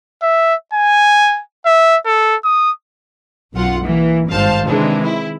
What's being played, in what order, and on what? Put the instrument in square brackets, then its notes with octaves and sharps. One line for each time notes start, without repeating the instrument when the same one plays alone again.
[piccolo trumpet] E5
G#5
E5
A4
D#6
[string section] B1 F#2 F4 F#5
E3 A#3
G#1 G2 C5 F5 A5
C3 D#3 E3 G#3 D4
E4